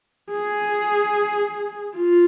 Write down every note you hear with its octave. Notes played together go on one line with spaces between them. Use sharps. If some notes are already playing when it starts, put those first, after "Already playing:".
G#4
F4